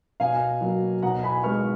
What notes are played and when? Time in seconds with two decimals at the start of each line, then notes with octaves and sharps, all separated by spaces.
0.20 B2 F5 G#5
0.61 F#3 A#3
1.02 B2 F#5 A#5
1.23 G#5 B5
1.43 G#3 B3 C#6 F6